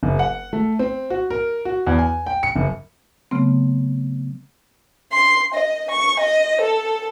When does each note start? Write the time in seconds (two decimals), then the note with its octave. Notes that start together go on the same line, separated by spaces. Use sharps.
0.03 F#1
0.19 F#5
0.53 A3
0.79 C4
1.10 F#4
1.30 A#4
1.65 F#4
1.87 E2
1.99 G#5
2.26 G5
2.43 C#7
2.56 F#1
3.31 C#3 F#3 A3 B3 C4
5.11 C6
5.53 D#5
5.90 C#6
6.19 D#5
6.61 A4